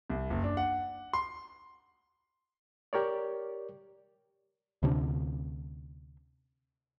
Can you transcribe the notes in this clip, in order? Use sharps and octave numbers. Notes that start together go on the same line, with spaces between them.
C2
F#1
D4
F#5
C6
G4 A#4 C#5 D5
D2 C3 C#4 D4